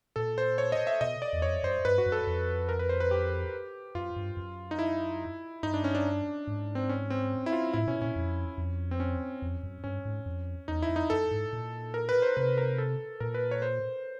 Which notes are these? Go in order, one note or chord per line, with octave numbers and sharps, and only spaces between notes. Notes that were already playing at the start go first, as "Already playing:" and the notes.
A#2 A4
C5
C#5
D#5
E5
B2 D#5
D5
E2
F2 C#5
F#2 C5
G2 B4
F#4
F#2
A4
F2
A#4
B4
C5
B4
G4
F#2 F4
G2
F#2
D#4
E4
G2 D#4
D4
C#4
D4
G#2
C4
C#4
C4
E4
F4
A2 E4
B2 C#4
A#2 C#4
F2
F2
C4
C#4
F2
F#2
G2 C#4
G#2
F2
E2 D#4
E4
F2
D#4
F#2 A4
G#2
A#2
A#4
B4
C5
C3 B4
A#4
A4
A#2 A#4
B4
C#5
C5